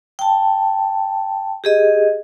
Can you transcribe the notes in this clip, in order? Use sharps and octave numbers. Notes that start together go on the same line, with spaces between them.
G5 A5
G4 G#4 D#5